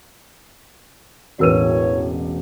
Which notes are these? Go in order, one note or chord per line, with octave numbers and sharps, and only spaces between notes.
E1 A1 E3 F#4 A#4 B4 C#5 D#7